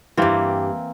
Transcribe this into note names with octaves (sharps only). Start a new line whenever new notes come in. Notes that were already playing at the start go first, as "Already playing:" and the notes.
G2 E3 G3 A#3 C4